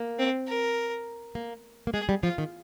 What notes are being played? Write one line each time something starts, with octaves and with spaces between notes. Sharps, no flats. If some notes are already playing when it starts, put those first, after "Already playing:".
Already playing: A#3
C4
A#4
A#3
A#3
G#3 G#4
G3
F3 F4
D#3